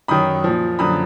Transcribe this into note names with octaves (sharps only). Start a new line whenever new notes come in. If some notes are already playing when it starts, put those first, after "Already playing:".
F#2 D#3 F#3 B5 D#6
A#2 F3
F#2 D3 F3 B5 D#6